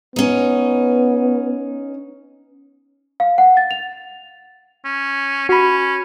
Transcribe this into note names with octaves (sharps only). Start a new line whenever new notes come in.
B3 C#4 D#4
F5
F#5
A6
F7
C#4
C#4 F#4 B5